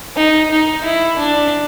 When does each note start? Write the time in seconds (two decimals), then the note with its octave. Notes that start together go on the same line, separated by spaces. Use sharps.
0.16 D#4
0.50 D#4
0.84 E4
1.18 D4